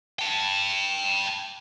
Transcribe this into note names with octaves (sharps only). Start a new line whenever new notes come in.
G5 A5